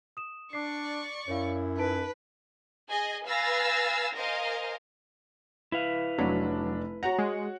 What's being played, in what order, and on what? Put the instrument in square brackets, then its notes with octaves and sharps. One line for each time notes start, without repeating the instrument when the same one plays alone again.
[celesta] D#6 E7
[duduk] D4 [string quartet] D5 C#6 [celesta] D6 C7
[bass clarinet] F#2 [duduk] E4 [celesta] C#5 F5
[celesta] D#4 A5 D7 [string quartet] B4
[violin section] G#4 D#5 G#5
B4 F5 G#5 E6 A6 A#6
A#4 C5 D#5 F5 G#5
[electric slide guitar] E4 B4 F5
[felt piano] F1 D4 [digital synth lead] F#3
[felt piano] F#4 C#5 F#5 [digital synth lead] A#5
[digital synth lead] G#3